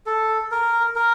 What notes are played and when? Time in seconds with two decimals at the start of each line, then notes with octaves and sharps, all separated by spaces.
0.06 A4
0.51 A#4
0.96 A#4